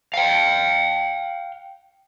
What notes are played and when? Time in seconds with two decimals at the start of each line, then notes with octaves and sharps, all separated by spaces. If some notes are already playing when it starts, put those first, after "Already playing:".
0.14 F5 G5